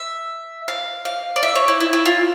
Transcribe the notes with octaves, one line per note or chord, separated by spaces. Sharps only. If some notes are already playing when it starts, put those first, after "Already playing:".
Already playing: E5
F5
F5
D5
E5
C#5
E4
E4
E4
F4